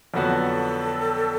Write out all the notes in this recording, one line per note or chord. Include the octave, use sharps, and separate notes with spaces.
F2 D3 F#3 B3 F#4 A4